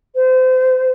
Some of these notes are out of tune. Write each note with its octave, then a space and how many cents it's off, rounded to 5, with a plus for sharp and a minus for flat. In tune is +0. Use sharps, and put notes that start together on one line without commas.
C5 -30